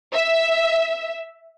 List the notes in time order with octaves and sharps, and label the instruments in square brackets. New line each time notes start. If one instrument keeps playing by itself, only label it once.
[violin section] E5